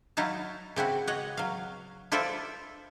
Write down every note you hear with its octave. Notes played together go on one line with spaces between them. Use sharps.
F#3 D#4 E4 F5 A5
C#3 C4 E4 F#4
C#5 D#5 F#5
F#3 F5
E4 F4 A4 C5 D5 E5